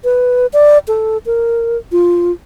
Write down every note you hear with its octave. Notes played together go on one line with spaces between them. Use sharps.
B4
D5
A4
A#4
F4